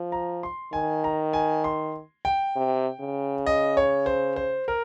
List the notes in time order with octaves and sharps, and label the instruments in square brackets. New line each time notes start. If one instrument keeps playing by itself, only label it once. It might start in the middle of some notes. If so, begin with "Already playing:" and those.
Already playing: [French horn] F3
[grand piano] A#5
C6
[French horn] D#3 [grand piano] G#5
[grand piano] A#5
G#5
C6
G5
[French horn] C3
C#3
[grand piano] D#5
C#5
C5
C5
A#4